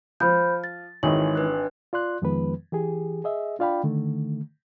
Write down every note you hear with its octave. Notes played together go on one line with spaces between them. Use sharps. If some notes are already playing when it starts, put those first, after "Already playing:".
F3 C5 B5 G6
A6
G#1 D#3 E3 G#3 C#5 F#7
D4 B4 F#6
F4 D5 C6 F#6
F2 D#3 F3 G#3 B3 B4
E3 G4 G#4
G#4 D#5 E5
D4 F4 D5 F5 G5 B5
D3 D#3 A3